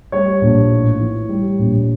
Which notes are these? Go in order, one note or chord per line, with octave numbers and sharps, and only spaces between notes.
G3 C#5
A#1
A2
E3
G3
A#1